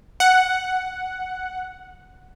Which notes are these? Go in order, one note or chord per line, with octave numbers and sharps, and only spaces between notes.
F#5